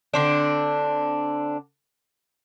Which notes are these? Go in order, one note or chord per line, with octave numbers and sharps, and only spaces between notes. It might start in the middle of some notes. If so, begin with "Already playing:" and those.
D3 C4 D4